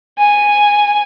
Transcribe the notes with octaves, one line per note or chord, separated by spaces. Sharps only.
G#5